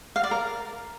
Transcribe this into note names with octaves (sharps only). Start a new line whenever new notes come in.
F5
D5
A#4